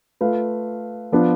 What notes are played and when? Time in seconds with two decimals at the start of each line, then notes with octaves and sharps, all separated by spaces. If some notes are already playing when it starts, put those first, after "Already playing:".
0.21 A3 F4 B4 F5
1.12 F3 B3 D4 F4